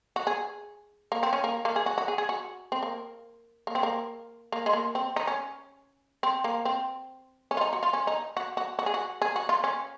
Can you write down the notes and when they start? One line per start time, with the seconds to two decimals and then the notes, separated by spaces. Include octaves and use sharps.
0.16 F#4
0.27 G#4
1.12 A#3
1.23 C4
1.33 C#4
1.44 A#3
1.65 A#3
1.76 G#4
1.86 F#4
1.98 F#4
2.08 G#4
2.18 G#4
2.29 F#4
2.72 C4
2.83 A#3
3.67 A#3
3.75 C4
3.83 A#3
4.52 A#3
4.66 G#3
4.73 A#3
4.95 C4
5.16 D#4
5.27 C#4
6.23 C4
6.44 A#3
6.65 C4
7.51 C#4
7.57 F4
7.61 D#4
7.73 F#4
7.83 F4
7.93 C#4
8.07 D#4
8.37 F#4
8.57 F#4
8.79 F#4
8.86 G#4
8.94 F#4
9.22 G#4
9.36 F#4
9.49 F4
9.64 C#4